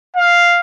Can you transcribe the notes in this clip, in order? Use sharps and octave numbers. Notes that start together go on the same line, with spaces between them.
F5